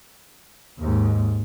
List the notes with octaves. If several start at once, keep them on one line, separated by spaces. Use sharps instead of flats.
D#2 G#2